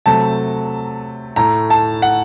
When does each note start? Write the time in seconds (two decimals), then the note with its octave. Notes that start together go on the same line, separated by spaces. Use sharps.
0.06 C3 F#3 A3 A5
1.36 A2 A3 A#5
1.70 A5
2.02 F#5